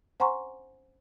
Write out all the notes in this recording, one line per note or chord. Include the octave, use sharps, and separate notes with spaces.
C5 F#5 G#5 A#5 C6 C#6